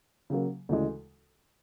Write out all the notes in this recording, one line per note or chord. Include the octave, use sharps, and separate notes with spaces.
C#3 F#3 A#3
D2 C#3 E3 G#3